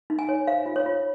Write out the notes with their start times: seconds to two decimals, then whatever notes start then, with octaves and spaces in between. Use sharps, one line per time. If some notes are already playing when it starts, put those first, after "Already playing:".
0.10 D#4
0.19 G#5
0.29 C#5
0.47 C5 F5
0.66 F4
0.76 C#5
0.86 F4